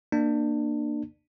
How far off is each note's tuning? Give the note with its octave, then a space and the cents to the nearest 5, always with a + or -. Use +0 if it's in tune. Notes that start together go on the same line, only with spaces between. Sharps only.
A#3 +0 D4 +25